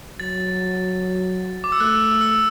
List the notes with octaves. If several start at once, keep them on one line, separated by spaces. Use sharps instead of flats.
F#3 A6
D6
E6
A3 F#6
E6
E6